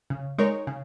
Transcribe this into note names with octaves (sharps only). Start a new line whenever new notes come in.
C#3
G#3 D#4 A#4 C#5
C#3